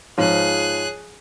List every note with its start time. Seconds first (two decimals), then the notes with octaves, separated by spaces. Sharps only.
0.18 G#2 F3 F4 G#4 C#5 F#6